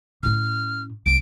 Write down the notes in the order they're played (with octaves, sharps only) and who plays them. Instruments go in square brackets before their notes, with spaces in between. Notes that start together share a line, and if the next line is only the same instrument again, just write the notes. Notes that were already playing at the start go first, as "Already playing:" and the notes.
[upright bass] A2 C#4 [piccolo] F6
[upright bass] C2 [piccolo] D7